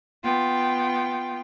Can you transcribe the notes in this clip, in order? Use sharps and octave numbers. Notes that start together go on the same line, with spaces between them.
B3 F4 G5